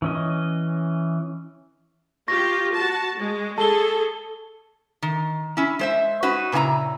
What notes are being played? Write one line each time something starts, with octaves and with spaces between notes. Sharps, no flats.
E3 C#4 D#5
F4 G4 C#6 A#6
F#4 A5
G#3
G#4 A4 A5 G7
D#3
C#4 E4
G#3 C5 E5
C#4 D#4 F#4 B4
A#2 C#3 E4 G#5 A#5